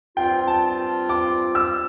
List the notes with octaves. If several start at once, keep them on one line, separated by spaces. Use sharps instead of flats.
G2 F3 C4 F4 G5
A5
D6
E6